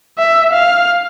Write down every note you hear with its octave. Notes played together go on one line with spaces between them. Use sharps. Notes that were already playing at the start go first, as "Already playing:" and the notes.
E5
F5